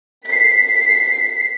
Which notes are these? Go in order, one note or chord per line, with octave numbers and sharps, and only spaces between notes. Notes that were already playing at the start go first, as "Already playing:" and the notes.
B6 C7